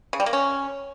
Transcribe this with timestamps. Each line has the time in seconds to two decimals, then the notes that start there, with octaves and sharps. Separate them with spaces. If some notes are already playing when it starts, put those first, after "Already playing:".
0.13 C#3
0.20 G3
0.26 A#3
0.33 C#4